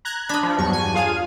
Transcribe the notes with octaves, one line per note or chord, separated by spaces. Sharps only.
A#5 F#6 G#6
D4 D#5 B5
F3
E2 G2 F#3 C#6
G#5
F4 G#4 F5